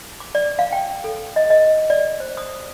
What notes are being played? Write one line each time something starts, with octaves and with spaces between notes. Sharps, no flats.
D6
D5
F5
G5
A4
D#5
D#5
D5
C5
D#6